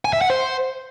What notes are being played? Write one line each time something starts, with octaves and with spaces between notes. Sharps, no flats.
G#5
E5
F#5
C5